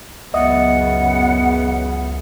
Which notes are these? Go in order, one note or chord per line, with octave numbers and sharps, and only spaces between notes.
C#2 F#2 C#3 B3 D#5 E5 F#5 D#6